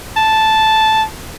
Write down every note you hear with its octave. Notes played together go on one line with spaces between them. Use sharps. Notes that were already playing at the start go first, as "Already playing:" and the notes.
A5